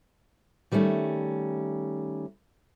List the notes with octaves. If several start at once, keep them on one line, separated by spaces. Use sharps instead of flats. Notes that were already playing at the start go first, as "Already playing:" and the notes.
D#3 G3 A3 C#4